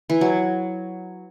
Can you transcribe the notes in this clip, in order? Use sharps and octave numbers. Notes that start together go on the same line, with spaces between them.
E3
F#3